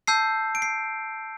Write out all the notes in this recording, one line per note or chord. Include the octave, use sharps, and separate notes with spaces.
A5 E6 G6 C7
D7
C7